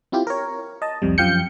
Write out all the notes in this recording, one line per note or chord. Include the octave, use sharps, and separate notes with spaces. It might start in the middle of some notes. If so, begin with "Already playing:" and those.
C4 E4 F4 G4
A#4 C#5
D#5 A5
C2 F2 C3 G3
F#2 F3 F5 G5 G6 C#7